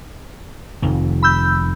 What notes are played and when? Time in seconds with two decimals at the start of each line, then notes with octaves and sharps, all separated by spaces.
0.82 F1 F2 D#3
1.23 B5 E6 G6